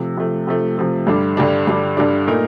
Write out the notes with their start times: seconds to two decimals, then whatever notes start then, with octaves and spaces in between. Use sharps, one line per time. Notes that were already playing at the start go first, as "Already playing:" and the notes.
Already playing: C3 F3 A3
0.17 C3 F3 A3
0.47 C3 F3 A3
0.78 C3 F3 A3
1.07 G2 D3 G3 D4
1.37 G2 D3 G3 D4
1.67 G2 D3 G3 D4
1.97 G2 D3 G3 D4
2.27 A#2 A3 D#4 A#4